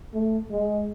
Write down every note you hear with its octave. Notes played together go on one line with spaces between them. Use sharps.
A3
G#3